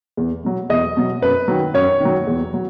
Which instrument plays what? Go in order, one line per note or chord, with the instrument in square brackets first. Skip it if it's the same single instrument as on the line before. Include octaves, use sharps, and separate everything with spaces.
[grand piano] E2
B2 F#3
E2 D#5
B2 F#3
F#2 B4
D#3 F#3
F#2 C#5
D#3 F#3
E2
F#3